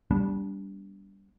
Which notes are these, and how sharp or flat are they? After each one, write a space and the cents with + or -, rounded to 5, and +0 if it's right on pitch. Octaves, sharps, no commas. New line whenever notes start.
G3 +0 B3 -35 D4 -30